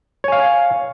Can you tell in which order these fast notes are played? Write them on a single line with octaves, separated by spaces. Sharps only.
C#5 G#5 F5